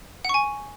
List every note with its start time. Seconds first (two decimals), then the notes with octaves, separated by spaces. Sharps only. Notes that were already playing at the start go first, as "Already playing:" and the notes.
0.25 F#5
0.29 C#6
0.34 G#5